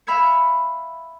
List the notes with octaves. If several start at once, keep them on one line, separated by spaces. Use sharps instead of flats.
E5 F5 B5 E6 G#6 C#7